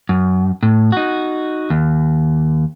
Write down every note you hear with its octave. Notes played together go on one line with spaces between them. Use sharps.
F#2
A2
D#4 F#4
D#2